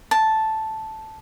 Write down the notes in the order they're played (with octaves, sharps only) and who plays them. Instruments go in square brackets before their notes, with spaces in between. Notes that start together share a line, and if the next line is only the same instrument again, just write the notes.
[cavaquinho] A5